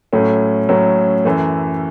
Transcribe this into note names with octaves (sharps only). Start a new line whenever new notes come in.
A2 F#3 A3 C#4
A2 F#3 A3 C#4
F#2 E3 A3